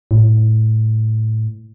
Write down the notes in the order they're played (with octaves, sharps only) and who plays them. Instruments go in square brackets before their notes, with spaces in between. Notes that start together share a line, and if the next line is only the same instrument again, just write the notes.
[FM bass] A2